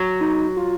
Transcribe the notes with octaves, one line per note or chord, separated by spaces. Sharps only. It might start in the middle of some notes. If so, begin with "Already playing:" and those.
Already playing: F#3
D#4
F4